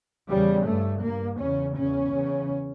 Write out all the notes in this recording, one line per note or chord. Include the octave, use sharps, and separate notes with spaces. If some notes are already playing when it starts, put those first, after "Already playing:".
E2 C#3 G3
G2 A3
G2 A#3
E2 C#3 C#4
E2 C#3 C#4
E2 C#3